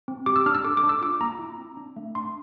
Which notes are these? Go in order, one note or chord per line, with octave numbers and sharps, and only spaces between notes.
C4
G4 D6
E6
D4 F6
E6
A4 D6
D6
D4
E6
F4 D6
A#3 A#5
E4
C4
D4
A3
D4 C6